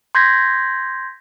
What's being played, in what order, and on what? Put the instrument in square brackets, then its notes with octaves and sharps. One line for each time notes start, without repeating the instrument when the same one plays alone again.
[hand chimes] C6 G6 G#6 A#6 B6